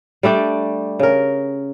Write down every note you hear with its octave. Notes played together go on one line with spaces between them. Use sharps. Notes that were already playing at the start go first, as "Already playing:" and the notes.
G3 A3 D4 G4
C#3 A#4